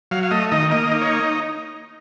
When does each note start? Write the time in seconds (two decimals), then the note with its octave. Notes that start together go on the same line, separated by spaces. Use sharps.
0.11 F#3 F5
0.23 F5
0.31 A3 D#5
0.52 D#3 D#5
0.71 A#3 D#5
0.92 D#4
1.02 C#5